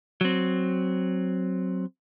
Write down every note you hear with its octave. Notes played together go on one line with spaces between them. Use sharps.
F#3 C4